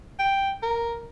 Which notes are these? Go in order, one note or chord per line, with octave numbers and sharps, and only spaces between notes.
G5
A#4